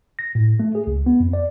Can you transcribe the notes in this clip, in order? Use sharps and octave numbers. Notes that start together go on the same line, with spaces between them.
A#6
A2
A3
G#4
C#2
B3
F2
D5